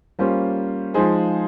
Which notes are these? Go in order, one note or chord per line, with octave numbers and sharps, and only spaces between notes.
G3 A#3 C#4 F4 C5
F3 G#3 D#4 G#4 C5